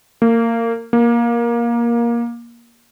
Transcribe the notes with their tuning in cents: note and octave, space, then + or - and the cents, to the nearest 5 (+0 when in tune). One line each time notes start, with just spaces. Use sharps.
A#3 -25
A#3 +15